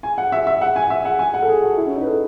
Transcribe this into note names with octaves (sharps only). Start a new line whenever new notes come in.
G#5
F#5
E5
E5
F#5
G#5
E5
F#5
G#5
F#5
A4
G#4
F#4
E4
C#4
D#4
B4
A4